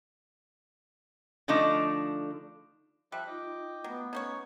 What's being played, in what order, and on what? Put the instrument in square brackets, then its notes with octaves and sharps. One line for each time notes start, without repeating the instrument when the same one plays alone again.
[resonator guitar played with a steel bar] D3 F3 A3 D4 D#4
[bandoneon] F3 E5 F#6 [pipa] G3
[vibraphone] D#4 F4 [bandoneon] D#5 G5 D6
[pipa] F#3 [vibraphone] A3 F5 B5 [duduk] B3
[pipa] C#4 C5 C#5 [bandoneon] D#4